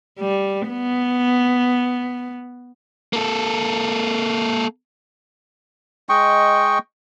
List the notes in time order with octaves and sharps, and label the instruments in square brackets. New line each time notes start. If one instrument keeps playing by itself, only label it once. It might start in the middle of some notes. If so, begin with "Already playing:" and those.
[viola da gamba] G3
B3
[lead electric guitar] A#3 A4
[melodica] G#3 D#5 G5 C#6